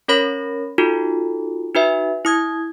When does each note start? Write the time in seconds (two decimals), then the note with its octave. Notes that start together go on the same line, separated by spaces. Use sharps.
0.08 C#4 A#4 C#5 B5 A#6
0.78 D#4 F4 F#4 A4
1.75 D#4 F#4 B4 E5
2.25 E4 D#6 G#6